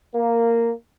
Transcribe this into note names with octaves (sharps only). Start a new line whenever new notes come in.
A#3